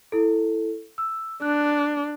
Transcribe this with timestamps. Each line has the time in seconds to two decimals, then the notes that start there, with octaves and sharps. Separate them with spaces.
0.12 E4 A4
0.98 E6
1.42 D4 F#6